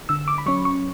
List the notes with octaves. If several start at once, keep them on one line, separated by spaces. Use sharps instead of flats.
D3 E6
D6
B5
F#3 C#4 C#6
C#6